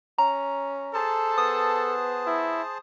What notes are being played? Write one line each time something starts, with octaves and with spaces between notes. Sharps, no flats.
C#4 A#5
G#4 A4 C5 A5
B3 D#6
E4